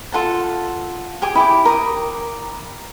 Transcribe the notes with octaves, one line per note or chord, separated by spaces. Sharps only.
F4 A4 F#5 A5
G4 G#4 D6
E4 G4 D6
A#4 D6 D#6